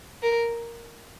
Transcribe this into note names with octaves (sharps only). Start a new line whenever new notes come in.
A#4